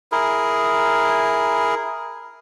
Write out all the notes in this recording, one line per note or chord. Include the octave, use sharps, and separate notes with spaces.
E4 G#4 A#4